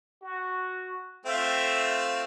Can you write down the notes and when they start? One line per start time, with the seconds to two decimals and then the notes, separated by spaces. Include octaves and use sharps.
0.22 F#4
1.26 A3 C4 F4 E5